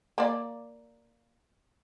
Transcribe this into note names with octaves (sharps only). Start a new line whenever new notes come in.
A#3 D5